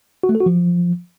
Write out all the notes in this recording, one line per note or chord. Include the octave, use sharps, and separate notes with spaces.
F#4
A3
A4
F#4
F3